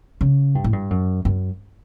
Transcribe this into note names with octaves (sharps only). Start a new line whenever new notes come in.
C#3
G2
A2
G2
F#2
F#2